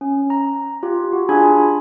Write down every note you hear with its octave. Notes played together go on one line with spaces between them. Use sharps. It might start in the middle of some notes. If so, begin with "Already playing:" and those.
C#4
A#5
F4 G4
F#4
D4 F4 G#4 G#5 B5 G#6